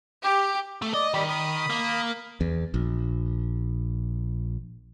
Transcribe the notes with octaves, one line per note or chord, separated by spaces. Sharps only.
G4
A3
D5 D#5
D#3 G3 G4 B5
B5 D#6
A#3
E2
A#1